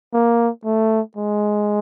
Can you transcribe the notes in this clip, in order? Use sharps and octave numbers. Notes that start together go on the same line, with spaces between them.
A#3
A3
G#3